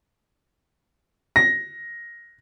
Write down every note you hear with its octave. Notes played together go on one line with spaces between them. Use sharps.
A#6